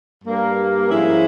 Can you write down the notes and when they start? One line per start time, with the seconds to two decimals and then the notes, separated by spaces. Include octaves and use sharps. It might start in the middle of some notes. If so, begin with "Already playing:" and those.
0.24 G2 G3 A#3
0.89 G#2 F3 G#3 C#4 E4